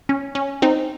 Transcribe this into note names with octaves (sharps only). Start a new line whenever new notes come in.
C#4
C#4
C4 D#4